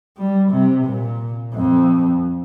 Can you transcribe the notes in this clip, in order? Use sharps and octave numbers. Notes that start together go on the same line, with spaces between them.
G3
C3
A#2
F2